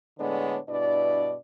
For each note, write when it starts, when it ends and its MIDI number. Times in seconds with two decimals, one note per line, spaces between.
0.18 0.57 45
0.18 0.57 50
0.18 0.57 56
0.18 0.57 59
0.18 0.57 62
0.18 0.57 73
0.68 1.35 43
0.68 1.35 47
0.68 1.35 62
0.68 1.35 64
0.68 1.35 74